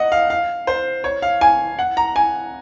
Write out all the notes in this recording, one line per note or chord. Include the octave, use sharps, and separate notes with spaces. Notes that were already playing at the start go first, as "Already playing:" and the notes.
Already playing: D#5 F#5
F5
F5
C5
C#5
F5
G#5
F#5
A#5
G#5